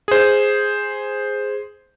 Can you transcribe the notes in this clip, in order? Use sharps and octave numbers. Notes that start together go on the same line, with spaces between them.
G#4 C5